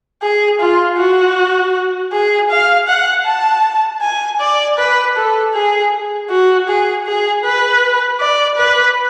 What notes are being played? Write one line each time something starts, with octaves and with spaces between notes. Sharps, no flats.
G#4
F4
F#4
G#4
F5
F#5
A5
G#5
D5
B4
A4
G#4
F#4
G#4
G#4
B4
D5
B4